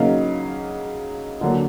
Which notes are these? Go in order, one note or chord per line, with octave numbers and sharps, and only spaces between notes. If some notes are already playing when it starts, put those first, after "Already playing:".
Already playing: C#3 F#3 A#3 D#4 F5
D3 F#3 A#3 D4